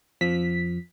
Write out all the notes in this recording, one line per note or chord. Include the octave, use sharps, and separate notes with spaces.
F2 F3 B6